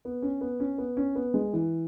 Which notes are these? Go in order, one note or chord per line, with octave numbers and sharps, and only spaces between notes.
B3
C#4
B3
C#4
B3
C#4
B3
G#3
E3